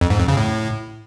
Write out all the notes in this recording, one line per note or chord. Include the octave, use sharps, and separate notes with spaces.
F2
G#2
F2
C#3
A2